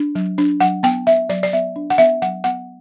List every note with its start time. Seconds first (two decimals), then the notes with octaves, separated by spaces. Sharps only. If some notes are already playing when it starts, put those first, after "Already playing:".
Already playing: D4
0.15 F#3
0.38 D4
0.60 F#3 F#5
0.83 B3 G5
1.07 B3 E5
1.29 F#3 D5
1.43 D5
1.53 B3 E5
1.76 D4
1.90 F#5
1.98 B3 E5
2.22 F#3 F#5
2.44 B3 F#5